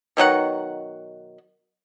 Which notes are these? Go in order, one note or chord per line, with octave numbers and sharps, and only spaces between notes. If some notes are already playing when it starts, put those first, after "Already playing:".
B2 D#3 F#3 F#5